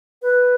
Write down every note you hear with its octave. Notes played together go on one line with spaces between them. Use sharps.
B4